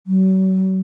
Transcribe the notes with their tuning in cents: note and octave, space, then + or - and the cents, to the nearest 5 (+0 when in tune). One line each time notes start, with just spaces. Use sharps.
F#3 +40